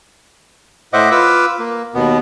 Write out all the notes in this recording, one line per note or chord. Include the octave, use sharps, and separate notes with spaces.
A2 C5 D#5 E5 F#5 D6
F4 B4 D6 E6
A#3
D#2 B2 B3